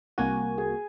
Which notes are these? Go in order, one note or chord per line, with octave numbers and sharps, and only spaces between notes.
C2 A#3 F#4 G#5
G#4